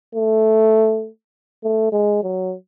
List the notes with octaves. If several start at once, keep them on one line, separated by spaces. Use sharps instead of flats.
A3
A3
G#3
F#3